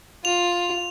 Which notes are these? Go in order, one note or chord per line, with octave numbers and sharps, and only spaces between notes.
F4 F7